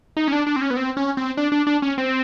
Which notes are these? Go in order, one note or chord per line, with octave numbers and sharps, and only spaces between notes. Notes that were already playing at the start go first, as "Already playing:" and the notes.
D#4
C#4
D4
D4
C4
C#4
B3
C4
C#4
C4
D4
D4
D4
C#4
C4